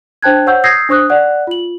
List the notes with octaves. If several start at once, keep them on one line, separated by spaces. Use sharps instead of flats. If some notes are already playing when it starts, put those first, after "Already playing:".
D4 C5 G5 A5 F#6 G#6
C5 C#5 F#5 C#6 E6 G6
D#6 E6 G6 G#6 A#6 C7
D4 C5 C#6 D#6 F#6
D5 F#5 F#6
F4 F#7